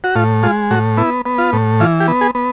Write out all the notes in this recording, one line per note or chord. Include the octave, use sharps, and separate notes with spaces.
F#4
A2 F4
G#3 F4
A2 F#4
B3 E4
B3
F4
A2
E3 F4
G4
B3
G#4
B3